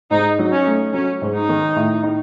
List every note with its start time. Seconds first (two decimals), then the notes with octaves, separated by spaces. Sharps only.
0.10 G#2 D#4
0.39 F#3
0.51 C#4
0.66 A3
0.93 F#3 C#4
1.22 G#2
1.35 D#4
1.49 D#3
1.76 A2
2.03 D#4